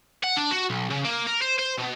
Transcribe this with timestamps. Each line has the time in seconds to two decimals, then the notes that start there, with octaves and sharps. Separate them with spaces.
0.24 F#5
0.37 D4
0.51 F#4
0.70 B1
0.90 C#3
1.05 A#3
1.27 A#4
1.42 C5
1.59 C5
1.78 B2